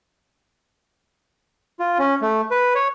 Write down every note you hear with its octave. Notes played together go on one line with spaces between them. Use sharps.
F4
C#4
A3
B4
C#5